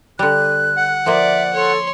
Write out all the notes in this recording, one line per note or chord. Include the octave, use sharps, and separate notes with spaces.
D3 G3 F#6
F#5
F3 A#3 D5 E5
A4 C#5 C6